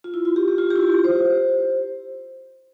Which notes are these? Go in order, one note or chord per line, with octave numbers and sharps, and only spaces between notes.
F4
E4
F4
G4
G4
F4
G4
E4
F4
G4
C5